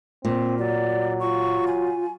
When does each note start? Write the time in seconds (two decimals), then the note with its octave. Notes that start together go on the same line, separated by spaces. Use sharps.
0.25 A#2 C4
0.58 F#3 D5
1.20 F4 C#6
1.67 G#5